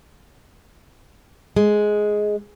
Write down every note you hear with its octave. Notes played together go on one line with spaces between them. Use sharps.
G#3